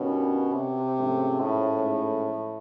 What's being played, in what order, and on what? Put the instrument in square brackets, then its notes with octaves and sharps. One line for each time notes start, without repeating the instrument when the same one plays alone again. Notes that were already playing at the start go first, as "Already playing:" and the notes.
Already playing: [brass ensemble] G2 D#3 G3 A#3 C#4 [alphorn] B2
[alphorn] C3
[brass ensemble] G#2 F3 A3 C#4
[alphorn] A2